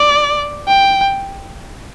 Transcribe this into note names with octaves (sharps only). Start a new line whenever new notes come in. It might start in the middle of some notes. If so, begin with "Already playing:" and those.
Already playing: D5
G5